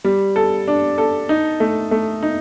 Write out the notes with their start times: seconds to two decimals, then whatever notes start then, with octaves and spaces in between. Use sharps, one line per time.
0.04 G3
0.36 A4
0.68 D4
0.98 A4
1.29 D#4
1.60 A3
1.91 A3
2.23 D#4